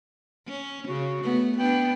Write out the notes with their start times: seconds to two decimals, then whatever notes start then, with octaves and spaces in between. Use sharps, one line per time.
0.47 C#4
0.88 C#3 F#4
1.23 A3 B3
1.58 B3 D4 G5